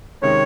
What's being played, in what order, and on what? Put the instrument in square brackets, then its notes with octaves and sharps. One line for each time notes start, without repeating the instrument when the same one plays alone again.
[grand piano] C3 D#3 G#3 C#4 [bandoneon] C#5